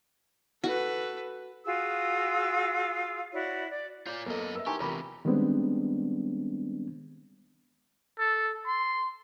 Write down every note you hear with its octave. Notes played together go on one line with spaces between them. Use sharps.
F#4 A4 B4
F4 F#4 G#4 E6
E4 F#4 C#5 D5
D5
F4 C#5 D5
F#2 A#3 B3 A4 D#5
A#4 B4 E5
D#4 E4 G4 B4 G#5 C6 C#6
E2 C3 F4 G4 A#4 B5 C#6
D#3 G3 G#3 B3 C4 D4
A4
C6